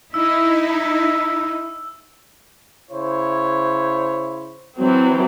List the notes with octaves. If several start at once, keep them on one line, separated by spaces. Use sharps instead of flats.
D#4 E4 E6
C#3 E4 C5 C#5
E3 F#3 C4